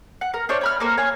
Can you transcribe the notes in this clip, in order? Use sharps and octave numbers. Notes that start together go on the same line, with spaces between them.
F#5
A#4
D4 C5 C#5
C#5 B5 F6
A#3 C4 A4 A#4
C#5 F5 G#5 C#6